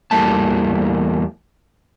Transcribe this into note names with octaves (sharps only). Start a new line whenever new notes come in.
E2 E3 G3 A3 A#3 A5